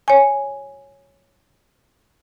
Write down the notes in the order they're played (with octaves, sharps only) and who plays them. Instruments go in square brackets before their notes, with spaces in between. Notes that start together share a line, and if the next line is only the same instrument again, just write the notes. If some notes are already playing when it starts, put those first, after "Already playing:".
[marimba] C#5 G#5